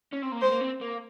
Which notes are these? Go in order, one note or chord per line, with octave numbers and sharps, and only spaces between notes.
C#4
C4
A#3
G#3 C5
A#3
C4
A#3